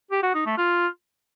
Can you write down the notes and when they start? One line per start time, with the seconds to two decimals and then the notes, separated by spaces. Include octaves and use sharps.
0.11 G4
0.23 F#4
0.34 D#4
0.46 A3
0.57 F4